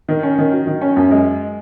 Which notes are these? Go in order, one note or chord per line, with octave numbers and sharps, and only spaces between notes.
D#3
C#4
D#3
F#3
D#3
C#4
F#2
G#3